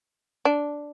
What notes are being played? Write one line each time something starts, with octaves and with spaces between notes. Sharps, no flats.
D4